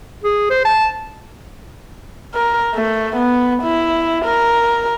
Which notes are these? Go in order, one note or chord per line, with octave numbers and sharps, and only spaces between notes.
G#4
C5
A5
A#4
A3
B3
E4
A#4